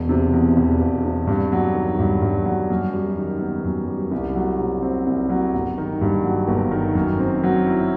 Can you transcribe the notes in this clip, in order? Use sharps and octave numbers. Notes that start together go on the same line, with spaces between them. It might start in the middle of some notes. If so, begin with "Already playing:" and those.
Already playing: E1
C3
E2
E1
E1
C3
G2
F#3
D#3
G2
G2
F#3
F#2
G3
D#3
B3
F#2
G3
C2
F#3
C3
C4
C2
F#3
G1
D#3
G2
F#3
G1
D#3
F#2
C4
F#3
E4